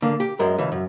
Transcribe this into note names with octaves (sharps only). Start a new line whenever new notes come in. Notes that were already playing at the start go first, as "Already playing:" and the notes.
D3 A#3
G4
F#2 G#3 A#4
C#2 E3
F#2